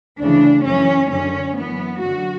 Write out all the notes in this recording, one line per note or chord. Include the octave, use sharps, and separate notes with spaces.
D2 C#3 E3 D4
F#2 E3 C#4
F#2 D3 C#4
F#2 E3 B3
F#2 D3 F#4